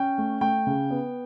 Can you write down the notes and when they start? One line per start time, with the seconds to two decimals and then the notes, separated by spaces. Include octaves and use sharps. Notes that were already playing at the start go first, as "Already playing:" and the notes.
Already playing: C#4 G5
0.18 A3
0.41 A3 G5
0.67 C#3
0.91 B3